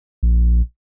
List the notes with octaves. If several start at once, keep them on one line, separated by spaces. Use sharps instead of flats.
A#1